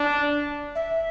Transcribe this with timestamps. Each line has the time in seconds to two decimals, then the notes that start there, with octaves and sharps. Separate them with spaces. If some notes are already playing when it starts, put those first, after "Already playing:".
Already playing: D4
0.75 E5